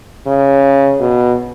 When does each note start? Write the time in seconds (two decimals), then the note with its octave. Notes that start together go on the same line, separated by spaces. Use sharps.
0.27 C#3
1.00 B2